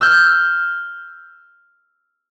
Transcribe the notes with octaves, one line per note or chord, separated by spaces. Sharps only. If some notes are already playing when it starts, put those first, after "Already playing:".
E6 F6 G6